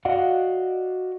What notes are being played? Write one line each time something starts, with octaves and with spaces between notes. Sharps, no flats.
F#4 D5 D#5 F5 F#5